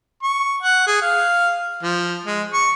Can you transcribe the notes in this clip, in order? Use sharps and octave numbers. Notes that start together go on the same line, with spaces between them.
C#6
F#5
G#4
F5
F3
G#3
C#6